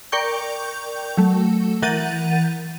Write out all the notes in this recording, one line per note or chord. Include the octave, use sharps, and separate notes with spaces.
A#4 D5 G5 C#6 G6
F#3 A3
E3 A#4 F#5 G6 A6 D#7